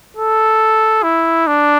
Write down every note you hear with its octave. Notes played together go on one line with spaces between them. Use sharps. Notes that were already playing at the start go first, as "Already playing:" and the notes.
A4
E4
D4